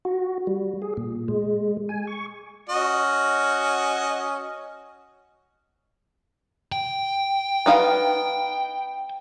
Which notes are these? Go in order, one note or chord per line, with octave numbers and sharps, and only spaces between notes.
F#4
G3
G#4
A#2
G#3
G#5
C#6
C#4 F#4 D#5
G5
B3 D#4 F5